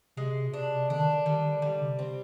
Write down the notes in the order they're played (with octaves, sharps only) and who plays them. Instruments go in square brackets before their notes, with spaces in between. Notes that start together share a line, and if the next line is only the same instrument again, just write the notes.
[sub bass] C3 [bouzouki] G#3
[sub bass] B2
[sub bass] C3 [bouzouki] D4
[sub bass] D3 [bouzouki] D4
[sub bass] D#3
D3
[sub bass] D#3 [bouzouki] G3
[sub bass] D3
[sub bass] D3 [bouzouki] G3
[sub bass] C3
[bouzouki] C4